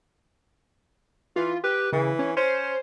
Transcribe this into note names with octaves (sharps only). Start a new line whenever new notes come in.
E3 F4
G4 B4
C#3 E3
C#4
C#4 C5